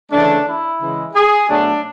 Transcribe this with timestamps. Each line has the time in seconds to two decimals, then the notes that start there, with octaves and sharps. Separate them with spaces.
0.12 C#3 E3 A3 D4
0.46 E4
0.81 C#3 E3 G#3
1.14 G#4
1.49 B2 F#3 A3 D4